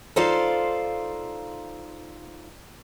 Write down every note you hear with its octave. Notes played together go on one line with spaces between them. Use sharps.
D#4 F4 A4 C5 D5 F5